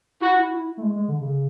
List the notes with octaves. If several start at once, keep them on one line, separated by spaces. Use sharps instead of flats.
E4 F#4
E4
E4
A3
G#3
G#3
D3
C#3